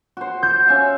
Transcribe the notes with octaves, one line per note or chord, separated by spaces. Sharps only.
F#4 C5
F#4 G6
C#4 E5 F5